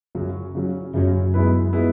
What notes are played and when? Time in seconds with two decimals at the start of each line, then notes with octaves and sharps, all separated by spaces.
0.15 F#2 C#3 F#3 C#4
0.55 C#3 F#3 C#4
0.94 F#2 C#3 F#3 C#4
1.33 F#2 G#3 B3 E4 B4
1.73 G#3 B3 E4 B4